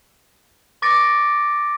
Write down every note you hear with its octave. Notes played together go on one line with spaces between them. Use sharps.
C#6 D6 A6 A#6 C#7 D7